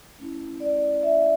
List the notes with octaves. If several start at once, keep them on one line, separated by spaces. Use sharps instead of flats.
A3 C#4 E4
D5
E5